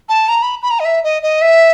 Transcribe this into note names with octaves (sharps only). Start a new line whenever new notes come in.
A5
A#5
B5
B5
A#5
D#5
E5
D#5
D#5
E5